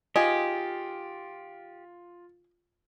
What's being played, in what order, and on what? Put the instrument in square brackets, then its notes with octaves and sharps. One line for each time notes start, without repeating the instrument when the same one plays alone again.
[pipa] D#3 G#4 [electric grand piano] F4 [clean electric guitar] G4 [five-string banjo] D#5